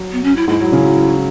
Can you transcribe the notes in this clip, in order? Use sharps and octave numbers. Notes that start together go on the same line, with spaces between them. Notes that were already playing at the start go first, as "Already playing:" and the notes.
Already playing: F#3
B3
C#4
E4
G#2 G#3 E4
F#3
C#3 C#4
F#3